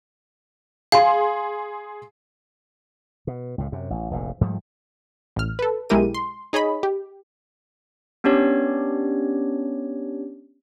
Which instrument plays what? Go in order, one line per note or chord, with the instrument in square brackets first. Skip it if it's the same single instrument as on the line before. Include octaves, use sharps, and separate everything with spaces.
[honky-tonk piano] G#4 C6 [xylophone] F5
[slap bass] B2
C#2 A2
F#2 C3
A1
F1 A#1 A2
G#2 F3 G3 A3
[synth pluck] A1 F6
A4 B4
B1 G#3 E4 G4 A#4 D#7
C6
D#4 G#4 C#5 D#5 B5
G4
[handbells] B3 C#4 D4 G4 C#5 D5